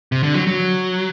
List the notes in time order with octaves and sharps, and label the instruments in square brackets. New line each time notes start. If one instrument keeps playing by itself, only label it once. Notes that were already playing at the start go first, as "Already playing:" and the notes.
[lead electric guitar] C3
D3
F#3
F#3